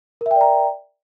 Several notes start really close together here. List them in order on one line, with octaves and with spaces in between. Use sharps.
A#4 E5 G5 D5 A#5